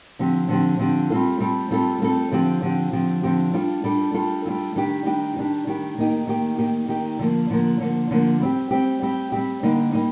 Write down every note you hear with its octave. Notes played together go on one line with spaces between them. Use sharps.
D3 F3 C4 G4
D3 F3 C4 G4
D3 F3 C4 G4
G3 C4 F4 A4
G3 C4 F4 A4
G3 C4 F4 A4
G3 C4 F4 A4
D3 F3 C4 G4
D3 F3 C4 G4
D3 F3 C4 G4
D3 F3 C4 G4
G3 D4 F4 A4
G3 D4 F4 A4
G3 D4 F4 A4
G3 D4 F4 A4
D#3 G3 D4 G4
D#3 G3 D4 G4
D#3 G3 D4 G4
D#3 G3 D4 G4
D#3 A#3 D#4 G4
D#3 A#3 D#4 G4
D#3 A#3 D#4 G4
D#3 A#3 D#4 G4
D3 F3 A#3
D3 F3 A#3
D3 F3 A#3
D3 F3 A#3
G3 C4 G4
G3 C4 G4
G3 C4 G4
G3 C4 G4
D3 G3 A#3 D#4
G3 A#3 D#4